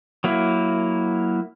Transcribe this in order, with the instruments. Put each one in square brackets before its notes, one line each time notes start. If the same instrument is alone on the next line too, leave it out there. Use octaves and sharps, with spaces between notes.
[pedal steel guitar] F#3 A#3 E4